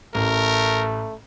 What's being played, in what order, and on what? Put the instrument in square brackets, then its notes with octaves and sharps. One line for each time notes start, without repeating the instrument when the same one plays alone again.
[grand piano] A1 [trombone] A3 [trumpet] A#4